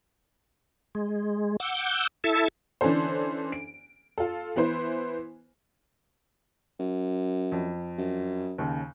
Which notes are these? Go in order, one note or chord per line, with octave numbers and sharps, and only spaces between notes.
G#3
F#5 D6 E6 G6
E4 A4 E5 A5
D3 E3 C#4 D4 A4 C5
D7
F4 A4
E3 B3 E4 B4 C5
F#2
F2
F#2
D#2 C#3